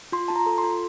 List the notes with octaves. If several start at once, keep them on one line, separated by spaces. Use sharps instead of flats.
F4 C6
F4 A5
A#5
A4
C6
F4